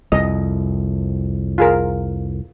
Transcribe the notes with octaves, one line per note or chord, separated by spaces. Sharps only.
C2 F2 D#5
F4 G#4 A#4